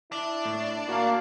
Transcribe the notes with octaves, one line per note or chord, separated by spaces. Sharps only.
D4 E4
A2
A#3 F#4 F5